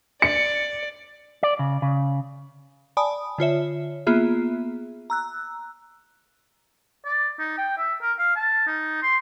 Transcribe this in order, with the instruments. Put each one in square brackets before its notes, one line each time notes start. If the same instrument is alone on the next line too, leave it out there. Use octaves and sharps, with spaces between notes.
[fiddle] D5 [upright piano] C#7
[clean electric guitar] D5
C#3
C#3
[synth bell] D5 G#5 A5 B5 D#6
D3 F4 C#5 E5
A#3 B3 F4 G#4 E5
A#5 E6 F#6
[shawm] D5
D#4
G5
E5
A#4
F5
A5
D#4
C6